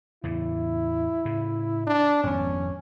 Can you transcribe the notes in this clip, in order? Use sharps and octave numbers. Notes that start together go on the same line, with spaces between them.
E2 A2 C#3 E4
A2 C#3
D4
G#1 F2 B3 C#4